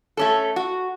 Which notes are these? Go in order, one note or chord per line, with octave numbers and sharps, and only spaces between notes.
A3 C#4 A4
F#4